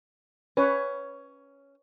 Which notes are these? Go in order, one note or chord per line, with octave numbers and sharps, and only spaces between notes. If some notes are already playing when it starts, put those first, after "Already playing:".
C#4 B4 C#5